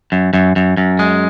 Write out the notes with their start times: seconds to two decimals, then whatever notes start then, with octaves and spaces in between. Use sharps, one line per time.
0.12 F#2
0.33 F#2
0.56 F#2
0.77 F#2
0.99 G#3